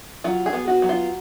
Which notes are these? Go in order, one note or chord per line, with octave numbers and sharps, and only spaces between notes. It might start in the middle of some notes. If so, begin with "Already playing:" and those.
F#3 F4
G#4
B3
F#4
F#3
F4